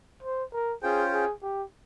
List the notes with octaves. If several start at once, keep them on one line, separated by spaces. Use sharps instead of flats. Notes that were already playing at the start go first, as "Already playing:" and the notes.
C5
A#4
C#4 F4 G#4 C5 G5
G#4
G4